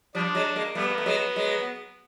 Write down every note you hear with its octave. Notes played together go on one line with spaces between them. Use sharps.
F3 G3 D4
F#3 G#3
G#3 A#3
G3 A3 B3
A#3
A3
F#3 G#3
F#3 G#3